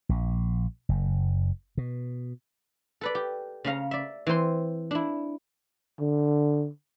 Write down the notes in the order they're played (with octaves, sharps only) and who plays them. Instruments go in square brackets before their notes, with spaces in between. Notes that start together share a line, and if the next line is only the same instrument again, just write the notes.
[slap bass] A#1
F#1
B2
[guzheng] A4 B4 D5
G4
C#3 C#4 F5 A#5
D5 E5
E3 C4 C5 C6
D4 E4
[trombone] D3